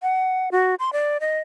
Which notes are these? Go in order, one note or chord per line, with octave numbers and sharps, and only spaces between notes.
F#5
F#4
C6
D5
D#5